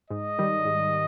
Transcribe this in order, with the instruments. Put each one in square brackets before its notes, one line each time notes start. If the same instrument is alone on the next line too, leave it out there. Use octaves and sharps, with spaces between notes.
[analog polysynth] G#2 [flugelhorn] D#5
[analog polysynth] D#3 G3
G#2